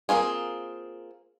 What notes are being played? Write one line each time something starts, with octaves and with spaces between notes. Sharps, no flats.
A#3 C4 F4 G#4